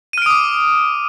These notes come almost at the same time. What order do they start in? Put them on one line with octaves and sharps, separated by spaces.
D#7 F6 D7 D#6 D6